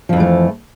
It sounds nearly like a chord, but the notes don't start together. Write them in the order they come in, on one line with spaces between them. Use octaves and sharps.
F3 F2 E3 A3